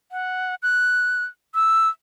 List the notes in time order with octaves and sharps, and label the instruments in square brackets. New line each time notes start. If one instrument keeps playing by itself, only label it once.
[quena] F#5
F#6
E6